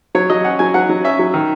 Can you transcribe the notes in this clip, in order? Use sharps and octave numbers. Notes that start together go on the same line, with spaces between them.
F#3 C#5
F#3 D#5
C#4 F#5
F#3 G#5
F#3 F#5
F#3
C#4 E5
F#3
D#3